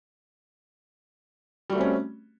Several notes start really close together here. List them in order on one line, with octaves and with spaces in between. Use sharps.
G3 F#4 A3 C4 C#4